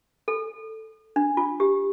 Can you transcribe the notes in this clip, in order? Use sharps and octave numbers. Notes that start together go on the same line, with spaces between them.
A4
D4
F4
G4